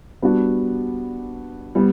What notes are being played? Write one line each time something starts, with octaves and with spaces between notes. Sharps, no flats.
G3 B3 D4 F#4
G3 B3